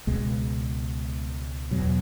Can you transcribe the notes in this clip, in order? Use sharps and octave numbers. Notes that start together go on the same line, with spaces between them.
C#2 B2 G#3
E2 B2 F#3